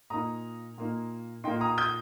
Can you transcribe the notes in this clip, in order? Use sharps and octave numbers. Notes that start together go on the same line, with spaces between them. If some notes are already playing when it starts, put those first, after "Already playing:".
A#2 A#3 D#4 A#5 D#6
A#2 A#3 D#4
A#2 A#3 D#4 G5 C6
A#5 D#6
D#6 G6